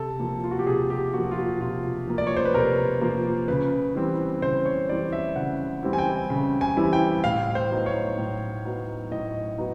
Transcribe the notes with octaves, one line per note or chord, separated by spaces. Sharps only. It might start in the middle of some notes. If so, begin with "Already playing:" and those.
Already playing: C3 A4
F3 A#3
F4
F#4
G4
C3 G#4
G4
F3 A#3 F#4
F4
F#4
C3 F4
F3 A#3
D5
C#5
C5
B4
C3 A#4
F3 A#3
C#3 B4
E3 G3 C4 E4
C#3 C5
C#5
E3 G3 C4 E4 D5
E5
C#3 F#5
E3 G3 C4 E4
G#5
G5
C#3
G#5
E3 G3 C4 E4
G5
A2 F5
C5
F#3 B3 D#4
C#5
A2
F#3 B3 D#4
A2 D#5
F#3 B3 D#4